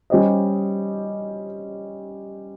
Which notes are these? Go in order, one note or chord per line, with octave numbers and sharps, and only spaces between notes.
G3 C#4 G4 C5 D#5